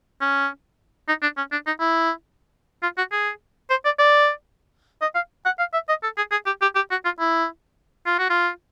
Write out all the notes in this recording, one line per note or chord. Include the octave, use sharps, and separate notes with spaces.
C#4
D#4
D4
C#4
D4
D#4
E4
F4
F#4
G#4
C5
D5
D5
D#5
F5
F#5
F5
E5
D#5
A4
G#4
G#4
G4
G4
G4
F#4
F4
E4
F4
F#4
F4